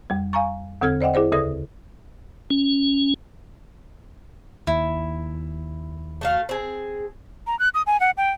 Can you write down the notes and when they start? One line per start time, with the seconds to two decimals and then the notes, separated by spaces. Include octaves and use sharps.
0.10 F2 G3
0.33 F5 G#5 A#5 C#6
0.81 E2 D3 C4 A4 F6 G#6
1.01 C5 D5 D#5 F#5 G5
1.14 E4 G#4 C5 D5
1.32 D2 C#3 A4 D5 D#6 A#6
2.50 C#4
4.67 D#2 E4
6.21 A3 F#4 F5
6.49 C4 G#4
7.47 A#5
7.59 F#6
7.74 D#6
7.87 G#5
8.00 F#5
8.17 G5